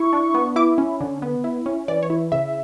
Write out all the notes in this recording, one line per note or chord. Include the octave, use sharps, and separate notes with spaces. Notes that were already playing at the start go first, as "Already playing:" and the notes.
Already playing: E4 C#6
D4
B3
E4 D6
C#4
D3
B3
E4
C#4
E3 D5
C#5
E4
C#3 E5